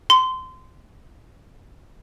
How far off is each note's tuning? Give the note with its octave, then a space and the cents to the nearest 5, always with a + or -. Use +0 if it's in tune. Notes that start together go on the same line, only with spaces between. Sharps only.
C6 -20